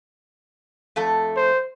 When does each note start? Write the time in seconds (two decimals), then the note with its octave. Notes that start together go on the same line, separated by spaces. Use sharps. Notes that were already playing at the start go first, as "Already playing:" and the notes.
0.96 F2 A3 A4
1.36 C5